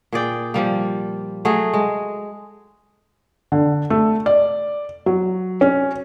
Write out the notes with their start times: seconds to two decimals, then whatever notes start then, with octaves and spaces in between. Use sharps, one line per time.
0.13 A#2 G#4 D5 G5
0.54 F3 G3 A#3
1.45 F#3 A3 G#4
1.74 G#3
3.52 D3
3.90 A3
4.26 D5
5.06 F#3
5.61 C#4